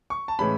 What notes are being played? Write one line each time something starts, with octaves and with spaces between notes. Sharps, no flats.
C#6
A5
A2 E3 G#3 C#4 B5